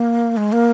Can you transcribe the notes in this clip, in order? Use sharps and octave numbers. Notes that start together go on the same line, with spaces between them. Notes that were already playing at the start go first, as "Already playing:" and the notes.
Already playing: A#3
G#3
A#3